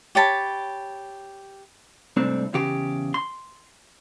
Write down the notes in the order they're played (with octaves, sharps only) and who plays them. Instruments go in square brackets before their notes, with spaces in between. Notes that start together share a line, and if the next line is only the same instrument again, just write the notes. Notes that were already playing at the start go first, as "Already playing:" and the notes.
[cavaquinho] G4 C#5 A5 B5
[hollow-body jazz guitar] C2 G#2 A3 C4 D4
E2 C#3 G4
C6